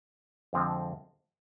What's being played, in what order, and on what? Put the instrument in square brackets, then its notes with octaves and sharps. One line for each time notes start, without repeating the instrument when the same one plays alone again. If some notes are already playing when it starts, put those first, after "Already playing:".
[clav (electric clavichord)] F2 D3 F3 G#3 C4